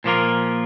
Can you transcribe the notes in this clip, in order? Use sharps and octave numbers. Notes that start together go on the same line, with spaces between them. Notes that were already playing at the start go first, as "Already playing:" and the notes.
A#2 F3 A#3 F4 A#4